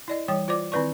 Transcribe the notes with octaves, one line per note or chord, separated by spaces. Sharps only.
E4 D5 D#5
E3 G3 C#5 G5
F4 C5 D5 D6
D#3 C4 E4 B4 D5 C#6